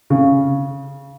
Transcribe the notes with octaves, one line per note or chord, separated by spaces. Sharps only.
C#3